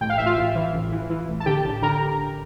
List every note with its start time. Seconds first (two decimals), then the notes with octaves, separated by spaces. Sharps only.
0.01 A1 G5
0.10 F5
0.18 A1 E5
0.26 F4 F5
0.37 A1
0.55 E3
0.73 A1
0.92 E3
1.10 E3
1.28 A1
1.40 A5
1.46 D3 G4 G5
1.64 A1
1.82 D3 A#4 A#5